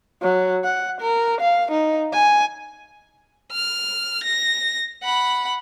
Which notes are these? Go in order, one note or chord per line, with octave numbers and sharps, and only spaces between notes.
F#3
F#5
A#4
F5
D#4
G#5
F6
A#6
F#5 B5